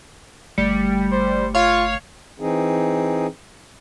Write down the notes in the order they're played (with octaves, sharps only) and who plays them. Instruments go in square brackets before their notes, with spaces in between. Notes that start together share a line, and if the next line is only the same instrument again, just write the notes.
[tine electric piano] G1 A3 C#7 [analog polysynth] G3
[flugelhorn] C5
[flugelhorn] F4 [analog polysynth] C#5 F5
[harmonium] E3 C4 D#4 G#4